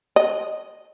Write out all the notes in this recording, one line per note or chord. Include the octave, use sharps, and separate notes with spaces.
D#5